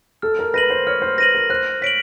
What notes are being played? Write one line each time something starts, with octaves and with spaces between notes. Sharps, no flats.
A4 F6
A#4
B4 A#6 D#7 F#7
C5
C#5 F6
C5
B4 A#6 D#7 F#7
A#4
C5 F#6
C#5 B6 D7 F#7